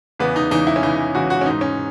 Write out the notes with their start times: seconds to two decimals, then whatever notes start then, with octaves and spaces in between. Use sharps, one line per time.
0.19 E2 C#3 E3 B3
0.36 D#4
0.51 E2 C#3 E3 D#4
0.67 E4
0.76 C#4
0.83 E2 C#3 E3 D#4
1.15 E2 C#3 E3 F#4
1.30 F#4
1.41 C#4
1.46 G#2 E3 D#4
1.61 C#4